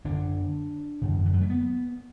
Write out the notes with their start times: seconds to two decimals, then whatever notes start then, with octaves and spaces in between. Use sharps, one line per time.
0.05 F#2 D3 D4
1.02 F#2 D3
1.17 D3
1.25 E3
1.33 F#3
1.41 A3
1.50 B3